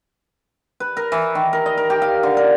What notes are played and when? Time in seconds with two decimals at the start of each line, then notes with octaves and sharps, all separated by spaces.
0.80 B4
0.97 A#4
1.12 E3
1.35 D#3
1.53 A#4
1.66 D#5
1.78 A#4
1.90 G4
2.02 F5
2.23 D3
2.37 A#4